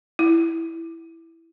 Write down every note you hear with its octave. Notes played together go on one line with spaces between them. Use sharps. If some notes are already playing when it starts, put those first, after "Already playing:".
E4